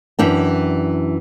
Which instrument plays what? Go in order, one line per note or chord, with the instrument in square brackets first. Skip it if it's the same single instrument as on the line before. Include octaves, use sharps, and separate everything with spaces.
[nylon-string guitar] F#2 E3 D4 G5